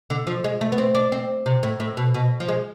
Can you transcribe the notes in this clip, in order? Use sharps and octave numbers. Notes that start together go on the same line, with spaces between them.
D3
F3
G#3
A3
B3
C4
D4
C4
C3
A2
A2
B2
B2
F3
G#3